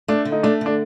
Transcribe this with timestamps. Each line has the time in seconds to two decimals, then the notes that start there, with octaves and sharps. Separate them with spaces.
0.08 A3 D4
0.25 D3
0.32 D#4
0.43 A3 D4
0.61 D3 D4